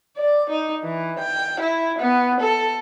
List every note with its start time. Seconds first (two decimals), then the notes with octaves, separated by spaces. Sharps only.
0.17 D5
0.50 D#4
0.84 E3
1.19 G5
1.60 E4
1.99 B3
2.40 A4